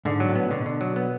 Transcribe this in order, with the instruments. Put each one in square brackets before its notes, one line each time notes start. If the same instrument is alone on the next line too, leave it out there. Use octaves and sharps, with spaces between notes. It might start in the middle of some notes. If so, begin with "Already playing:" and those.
[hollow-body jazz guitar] G#2 [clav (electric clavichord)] D3
[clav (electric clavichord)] F#3
[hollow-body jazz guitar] A2
[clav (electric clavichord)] B3
[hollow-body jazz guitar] B2 [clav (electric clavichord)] D3
[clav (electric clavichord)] D3
F#3
B3